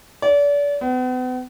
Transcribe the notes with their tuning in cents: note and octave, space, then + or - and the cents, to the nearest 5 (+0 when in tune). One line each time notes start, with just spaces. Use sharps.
D5 -35
B3 +40